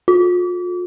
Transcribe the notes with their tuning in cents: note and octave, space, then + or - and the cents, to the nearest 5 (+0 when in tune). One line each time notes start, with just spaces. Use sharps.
F4 +40